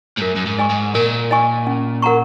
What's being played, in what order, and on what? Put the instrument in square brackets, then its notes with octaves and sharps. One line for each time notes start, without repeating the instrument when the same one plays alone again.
[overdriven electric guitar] G#2
[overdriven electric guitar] F#2 [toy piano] A#4
[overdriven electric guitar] F#2
G#2
[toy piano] D#5 G#5 C#6
[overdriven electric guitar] G#2
[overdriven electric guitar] A#2 [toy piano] A#4
[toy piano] D#5 G#5 C#6
C#4
A#4 F#5 A#5 C#6